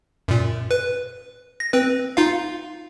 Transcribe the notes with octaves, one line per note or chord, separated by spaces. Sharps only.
F#2 A#2
B4
A#6
C4 B4
D#4 F4 F5